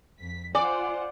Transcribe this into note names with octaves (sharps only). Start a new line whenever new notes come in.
F2 B6
F4 C5 D5 F#5 G#5 D6